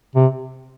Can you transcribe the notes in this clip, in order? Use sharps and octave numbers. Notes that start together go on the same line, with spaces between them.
C3